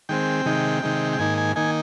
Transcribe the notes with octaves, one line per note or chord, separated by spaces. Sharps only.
D#3 G#3 C4 G5
C3 D#3 G#3 D#4
C3 D#3 G#3 D#4
G5
G#2 D#3 A#3 D#4 G#5
G#5
D#3 A#3 D#4 G#5